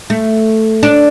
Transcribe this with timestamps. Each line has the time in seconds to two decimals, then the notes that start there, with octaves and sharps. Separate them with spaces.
0.10 A3
0.83 D4